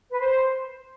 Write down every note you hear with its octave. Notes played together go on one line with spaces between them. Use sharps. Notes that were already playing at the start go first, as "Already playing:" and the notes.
B4
C5